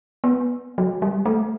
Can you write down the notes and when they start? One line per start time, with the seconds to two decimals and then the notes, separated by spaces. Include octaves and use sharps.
0.24 B3
0.78 F#3
1.02 G3
1.26 A3